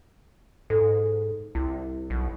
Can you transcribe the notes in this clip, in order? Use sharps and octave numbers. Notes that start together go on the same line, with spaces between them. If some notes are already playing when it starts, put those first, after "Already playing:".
G#2 A4
C2 E4
B1